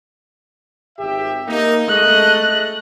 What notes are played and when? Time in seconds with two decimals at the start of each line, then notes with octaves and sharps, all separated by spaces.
0.98 G#1 G4 E5
1.47 A#3 D#4
1.88 G#3 A3 D#5 F#6